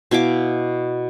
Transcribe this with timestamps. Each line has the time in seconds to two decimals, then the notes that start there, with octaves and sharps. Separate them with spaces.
0.11 B2 E4 F5 D6